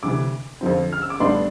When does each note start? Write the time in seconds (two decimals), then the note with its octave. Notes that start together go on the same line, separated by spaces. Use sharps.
0.03 D2 C3 E3 D6
0.61 F2 D3 F3 C4
0.93 F6
1.02 E6
1.10 D6
1.20 A1 A2 G3 B3 D4 C6